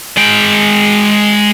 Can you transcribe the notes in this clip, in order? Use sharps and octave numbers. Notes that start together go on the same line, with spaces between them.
G#3 G5